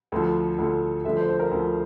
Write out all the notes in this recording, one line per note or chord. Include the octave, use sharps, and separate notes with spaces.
D2 D3 F3
D2 D3 F3
D2 D3 F3 E5
C5
C5
A#4
D2 D3 F3